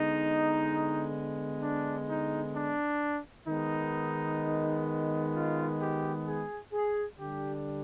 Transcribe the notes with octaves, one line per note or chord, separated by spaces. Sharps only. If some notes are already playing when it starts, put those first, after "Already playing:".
Already playing: D3 G#3 B3 D#4
D4
D#4
D4
D#3 G#3 B3 D#4
F4
G4
G#4
G#4
D3 G3 D4 G4